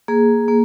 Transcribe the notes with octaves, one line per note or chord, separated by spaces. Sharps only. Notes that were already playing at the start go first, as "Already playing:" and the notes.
A#3 G#4
A#3